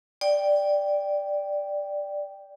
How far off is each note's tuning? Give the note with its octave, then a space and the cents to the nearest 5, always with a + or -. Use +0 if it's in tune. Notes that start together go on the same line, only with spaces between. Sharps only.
D5 +0 G5 +0